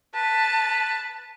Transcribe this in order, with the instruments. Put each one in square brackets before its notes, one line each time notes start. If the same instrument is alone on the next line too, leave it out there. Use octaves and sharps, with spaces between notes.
[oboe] B4 [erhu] A5